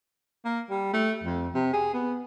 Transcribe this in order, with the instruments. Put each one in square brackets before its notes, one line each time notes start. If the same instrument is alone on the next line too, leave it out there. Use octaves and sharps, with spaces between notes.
[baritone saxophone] A#3
G3
A3
F2
C3
G#4
B3